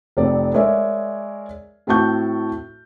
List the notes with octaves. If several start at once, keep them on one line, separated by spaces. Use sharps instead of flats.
F1 C4 A4 D5
G#3 A#4 C#5 D5 E5 G#5
A2 C4 F#4 A5 C#6 G6